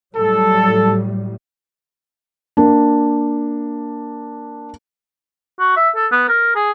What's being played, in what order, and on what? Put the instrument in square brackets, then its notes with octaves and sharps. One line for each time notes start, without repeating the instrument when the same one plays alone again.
[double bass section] A2 F#3 G3 [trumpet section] A4
[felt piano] A#3 D4
[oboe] F#4
E5
A4
B3
A#4
G#4